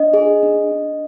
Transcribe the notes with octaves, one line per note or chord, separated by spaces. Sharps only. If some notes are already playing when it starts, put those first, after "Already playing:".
Already playing: D4 D#5
G#4
D4
D4